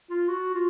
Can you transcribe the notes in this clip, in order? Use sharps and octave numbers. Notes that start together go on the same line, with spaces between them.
F4
F#4
F4